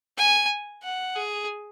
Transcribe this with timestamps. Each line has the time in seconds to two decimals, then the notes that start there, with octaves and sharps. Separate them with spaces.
0.17 G#5
0.83 F#5
1.16 G#4